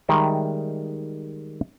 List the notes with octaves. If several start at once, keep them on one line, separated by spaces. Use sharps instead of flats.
D#3 G3 G#3 E5 G5